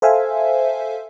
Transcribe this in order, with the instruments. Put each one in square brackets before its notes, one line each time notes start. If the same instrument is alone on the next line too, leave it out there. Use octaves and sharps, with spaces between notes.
[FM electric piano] A4 C5 E5 F5 G#5